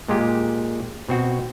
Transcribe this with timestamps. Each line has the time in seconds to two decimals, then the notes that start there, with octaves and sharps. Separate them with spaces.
0.08 A#2 G#3 F4 G4
1.09 B2 C4 F#4